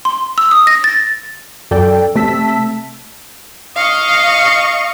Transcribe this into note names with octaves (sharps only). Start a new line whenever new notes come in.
C6
E6
D#6
A#6
A6
F#2 A4 D5 G5
C3 A3 A5 E6 B6
D#5 F5 C#6